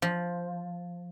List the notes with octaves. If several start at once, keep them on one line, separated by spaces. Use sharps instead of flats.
F3